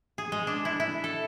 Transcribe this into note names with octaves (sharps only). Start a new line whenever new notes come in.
G#4
G#3
D4
E4
E4
A4